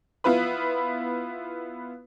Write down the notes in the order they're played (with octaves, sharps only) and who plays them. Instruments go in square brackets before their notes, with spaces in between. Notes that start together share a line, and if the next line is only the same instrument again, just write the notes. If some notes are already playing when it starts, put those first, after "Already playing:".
[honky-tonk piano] B3 E4 F4 B4 B5